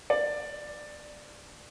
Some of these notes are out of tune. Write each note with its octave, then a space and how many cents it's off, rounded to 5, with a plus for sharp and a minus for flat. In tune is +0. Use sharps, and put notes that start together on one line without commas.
D5 +15